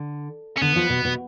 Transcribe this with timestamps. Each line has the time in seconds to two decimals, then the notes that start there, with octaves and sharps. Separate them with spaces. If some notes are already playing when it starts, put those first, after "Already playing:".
Already playing: D3
0.57 C#4
0.61 D3 B3
0.76 F3
0.90 B2
1.05 B2